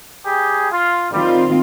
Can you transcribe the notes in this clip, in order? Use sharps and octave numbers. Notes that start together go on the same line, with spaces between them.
G3 G4 G#4
F4
D#3 G3 C4 F4